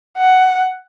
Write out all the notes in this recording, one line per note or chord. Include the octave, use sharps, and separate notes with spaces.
F#5